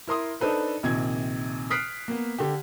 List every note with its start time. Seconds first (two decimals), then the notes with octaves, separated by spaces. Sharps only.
0.08 E4 A#4 C6 D#6
0.41 D4 D#4 A4 B4 C5
0.83 A#1 C3 D#3 G#6
1.70 D#6 F6 F#6 B6 C7 D7
2.08 A#3 B3
2.38 D3 G4